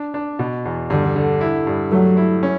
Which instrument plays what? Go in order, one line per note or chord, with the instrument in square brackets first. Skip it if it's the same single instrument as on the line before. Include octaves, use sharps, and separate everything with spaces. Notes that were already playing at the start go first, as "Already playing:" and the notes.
Already playing: [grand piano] D4
D4
B2
E2
[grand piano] G2 [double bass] D3
[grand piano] D3
E4
G2
[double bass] F#3 [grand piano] A3
[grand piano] E4
C#4